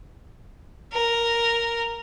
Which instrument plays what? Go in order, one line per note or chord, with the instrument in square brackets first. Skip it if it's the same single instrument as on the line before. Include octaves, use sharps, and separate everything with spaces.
[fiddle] A#4